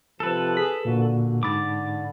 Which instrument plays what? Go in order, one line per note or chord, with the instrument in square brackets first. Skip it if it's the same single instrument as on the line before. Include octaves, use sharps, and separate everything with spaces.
[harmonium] C3 F3 [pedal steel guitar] A4 B4
[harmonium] G#4 [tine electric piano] B6
[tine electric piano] A#2 A#3 F#4 [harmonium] D3
[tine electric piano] G#2 B5 A6 [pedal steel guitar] D6